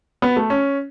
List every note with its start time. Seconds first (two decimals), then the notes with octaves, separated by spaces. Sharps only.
0.22 B3
0.37 A3
0.50 C#4